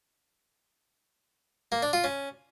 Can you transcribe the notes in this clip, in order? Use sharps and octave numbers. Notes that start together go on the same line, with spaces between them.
A#3
D4
F4
C#4